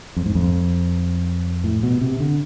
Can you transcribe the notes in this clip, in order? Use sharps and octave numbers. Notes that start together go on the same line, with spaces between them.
F2
G#2
F2
A2
B2
C3
D3